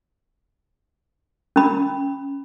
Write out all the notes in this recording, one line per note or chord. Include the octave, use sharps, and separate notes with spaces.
C#4 B5